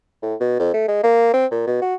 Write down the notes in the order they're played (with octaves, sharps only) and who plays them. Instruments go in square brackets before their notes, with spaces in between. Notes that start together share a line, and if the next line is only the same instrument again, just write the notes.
[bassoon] A2
B2
F2
A3
G#3
A#3
C4
A#2
B2
F#4